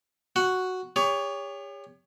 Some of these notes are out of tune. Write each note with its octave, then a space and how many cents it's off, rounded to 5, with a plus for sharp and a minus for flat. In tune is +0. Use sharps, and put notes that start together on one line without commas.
F#4 +0 F#5 +0
G4 +45 C#5 +20